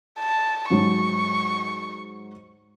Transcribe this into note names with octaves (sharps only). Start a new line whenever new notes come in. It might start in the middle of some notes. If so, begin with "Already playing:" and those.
A5
G#2 F#3 C#6